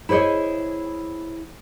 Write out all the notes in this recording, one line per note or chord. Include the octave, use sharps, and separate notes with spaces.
E4 G#4 C5 C#5 D#5